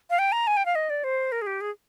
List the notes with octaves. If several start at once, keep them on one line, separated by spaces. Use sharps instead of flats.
F5
G5
A#5
G#5
G5
F5
D#5
D5
C5
A#4
G#4
G4
G#4